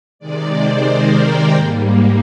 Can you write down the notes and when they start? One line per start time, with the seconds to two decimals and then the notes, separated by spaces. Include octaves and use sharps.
0.19 C3 D#3 G#3 D5
0.52 C5
0.86 A#4
1.19 G5
1.52 G#2 G3 A#3